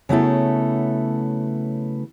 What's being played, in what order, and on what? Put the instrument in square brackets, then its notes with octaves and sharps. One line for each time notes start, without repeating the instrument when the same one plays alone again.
[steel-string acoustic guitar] C#3 F#3 A3 B3 E4 A4